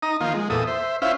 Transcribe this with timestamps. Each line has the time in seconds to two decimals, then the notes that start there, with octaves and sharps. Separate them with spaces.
0.03 D#4 A#5 D#6
0.21 D#3 F3 A#3 F4
0.34 G#3
0.50 E2 A#2 A4 D#6
0.67 C5 E5
1.02 C#4 E4 F4 C5 E5 F5